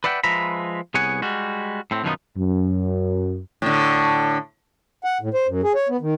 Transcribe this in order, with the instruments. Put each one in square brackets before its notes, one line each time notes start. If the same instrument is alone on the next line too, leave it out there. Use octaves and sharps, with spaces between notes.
[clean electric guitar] B4 D5 E5 F#5 G5
F3 G#3 B4 E5 A#5 B5
C2 B3 G#4 C#5 F#5 G#5
G3 G#3 F#4
A2 C4
F#2 B2 D#3 F3 B3 D#4
[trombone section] F#2
[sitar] A2 D3
[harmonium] F#5
A2
C5
F#2
G#4
C#5
B3
D#3